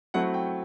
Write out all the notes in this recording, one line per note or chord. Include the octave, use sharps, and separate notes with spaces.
F#3 A3 C4 E4 F#5
G5